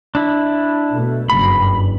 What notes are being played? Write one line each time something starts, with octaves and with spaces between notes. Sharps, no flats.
D4 E4
B2 A3
F#1 G2 B5